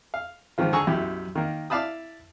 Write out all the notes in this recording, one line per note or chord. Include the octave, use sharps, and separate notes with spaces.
F5
G#2 D#3 F3 F4
D3 G#4 A#5 C#6 E6
B1 F#2 E4 G4
D#3 A#3
E4 D5 F5 A5 B5 D#6